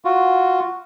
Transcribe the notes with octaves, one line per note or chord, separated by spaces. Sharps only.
F4 F#4